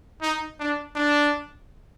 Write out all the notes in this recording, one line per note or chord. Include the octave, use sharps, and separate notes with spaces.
D#4
D4
D4